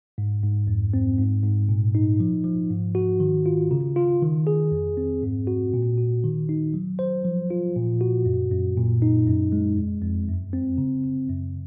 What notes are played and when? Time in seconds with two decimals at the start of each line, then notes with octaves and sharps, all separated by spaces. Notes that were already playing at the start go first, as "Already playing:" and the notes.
0.18 G#2
0.43 G#2
0.67 F2
0.94 C4
1.18 G#2
1.43 G#2
1.69 A#2
1.95 D#4
2.20 F3
2.44 F3
2.70 G#2
2.95 F#4
3.20 D#3
3.46 F4
3.71 C#3
3.96 F4
4.22 D#3
4.47 G#4
4.72 F2
4.97 C4
5.23 G#2
5.47 F#4
5.74 A#2
5.98 F#4
6.24 D#3
6.49 D#4
6.74 F#3
6.99 C5
7.25 F3
7.50 F4
7.76 A#2
8.01 F#4
8.26 F#2
8.51 F#2
8.77 A#2
9.02 D#4
9.27 F#2
9.52 G#3
9.77 F2
10.02 F2
10.28 F#2
10.53 C4
10.78 C#3
11.04 C#3
11.29 F#2